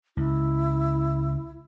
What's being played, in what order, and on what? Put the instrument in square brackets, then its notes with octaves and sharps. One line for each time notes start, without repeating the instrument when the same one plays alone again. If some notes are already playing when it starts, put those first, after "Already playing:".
[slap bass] C#2 [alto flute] E4